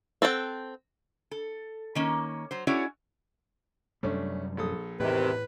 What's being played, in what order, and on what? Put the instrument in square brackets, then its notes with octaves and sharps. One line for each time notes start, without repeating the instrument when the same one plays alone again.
[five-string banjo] C4 A4 F#5 G5
[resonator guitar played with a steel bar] A4
D#3 A#3 C#4
F#3 C5
C#4 E4 F#4 G#4 C#5 D5
[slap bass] F#2 C3 G3 [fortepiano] A3 C#4 D4
[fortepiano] A#1 A4 D#6
[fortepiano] E2 [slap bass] A2 [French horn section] C3 D#3 [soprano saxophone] B4